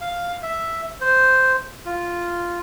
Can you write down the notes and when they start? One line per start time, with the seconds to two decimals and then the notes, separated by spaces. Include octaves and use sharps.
0.01 F5
0.43 E5
1.01 C5
1.85 F4